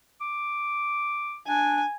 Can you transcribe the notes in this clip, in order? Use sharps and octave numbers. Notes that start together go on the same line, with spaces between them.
D6
D4 G#5